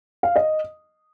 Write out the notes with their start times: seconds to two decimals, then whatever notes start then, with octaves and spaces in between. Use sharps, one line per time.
0.23 F5
0.36 D#5